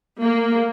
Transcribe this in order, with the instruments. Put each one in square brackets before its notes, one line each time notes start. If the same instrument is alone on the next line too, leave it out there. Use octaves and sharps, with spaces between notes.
[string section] A#3